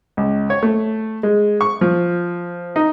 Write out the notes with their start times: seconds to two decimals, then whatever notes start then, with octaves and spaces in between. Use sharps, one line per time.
0.17 C#2
0.50 C#5
0.63 A3
1.23 G#3
1.61 C#6
1.81 F3
2.76 D#4